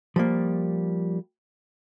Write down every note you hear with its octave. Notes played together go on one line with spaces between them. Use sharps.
F3 G3 A#3